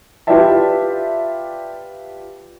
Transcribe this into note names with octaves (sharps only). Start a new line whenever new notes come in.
F4 G4 B4 D5 E5 A5